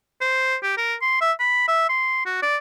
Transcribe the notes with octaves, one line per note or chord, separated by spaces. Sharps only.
C5
G4
A#4
C6
E5
B5
E5
C6
F#4
D5